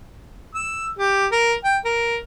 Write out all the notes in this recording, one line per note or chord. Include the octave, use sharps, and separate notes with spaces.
E6
G4
A#4
G5
A#4